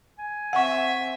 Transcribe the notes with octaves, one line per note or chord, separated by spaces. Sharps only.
G#5
C4 E5 F#5 C#6